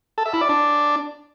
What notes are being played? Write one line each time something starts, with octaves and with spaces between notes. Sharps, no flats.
A4
E5
E4
D5
D4